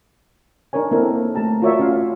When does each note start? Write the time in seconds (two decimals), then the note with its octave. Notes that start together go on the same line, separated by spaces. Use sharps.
0.73 D4 D#4 A#4 C#5 G#5
0.91 A#3 C4 D4 E4 A4 A#4
1.35 A3 G4 A5 A#5
1.62 F4 F#4 A#4 C#5 D5 E5
1.80 C#4 F4 F5